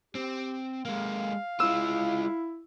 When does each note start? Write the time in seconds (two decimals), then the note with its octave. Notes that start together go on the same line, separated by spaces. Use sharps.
0.15 C4 G4
0.85 G#3 A#3 F5
1.60 G#3 E4 F4 E6